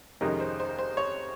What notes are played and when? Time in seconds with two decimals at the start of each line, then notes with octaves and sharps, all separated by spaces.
0.21 F2 C3 D#3 G#3 C#4 A#4
0.40 C5
0.60 C5
0.79 C5
0.97 C#5